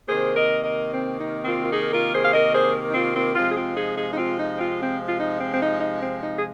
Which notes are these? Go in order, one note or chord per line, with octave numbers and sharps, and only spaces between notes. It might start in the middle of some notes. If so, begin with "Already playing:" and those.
C3 D#3 A#3 G#4 C5
A#4 D#5
A#4 D#5
C4
D#4
C4 F4
F4
D#4 G#4
F4 A#4
G#4 C5
F5
A#4 D#5
G#4 C5
D#4
C4 F4
C4 F4
C3 F3 G#3 C4 F4
G#4
C4 F4
D#4 G#4
D#4 G#4
D#4
C4 F4
D#4
C4 F4
C4
F4
D#4
C4
C4
D#4
D#4
C4
D#4
G#4